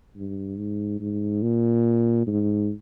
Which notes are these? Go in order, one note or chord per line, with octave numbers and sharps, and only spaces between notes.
G2
G#2
G#2
A#2
G#2